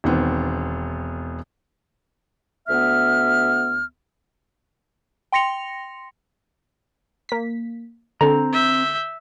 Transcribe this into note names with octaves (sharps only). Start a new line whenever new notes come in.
E1 D#3 B3 C4
D2 B3 E5 F6
G5 C6 A#6 C#7 F7
A#3 B6
D3 C4 A4 A#5
E5 G6